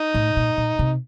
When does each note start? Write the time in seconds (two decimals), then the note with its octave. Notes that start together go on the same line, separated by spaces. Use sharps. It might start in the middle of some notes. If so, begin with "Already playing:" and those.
Already playing: D#4
0.14 A2
0.36 A#2
0.57 A#2
0.79 C3